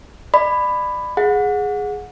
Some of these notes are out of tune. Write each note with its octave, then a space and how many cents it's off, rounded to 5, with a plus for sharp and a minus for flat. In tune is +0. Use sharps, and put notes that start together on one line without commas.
D5 +35 B5 +10
G#4 +0 F#5 -25